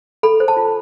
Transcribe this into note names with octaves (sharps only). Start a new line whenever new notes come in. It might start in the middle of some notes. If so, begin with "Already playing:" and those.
A4 B5
C5
A5
F4